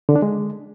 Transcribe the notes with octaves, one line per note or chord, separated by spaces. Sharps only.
D3
D4
G#3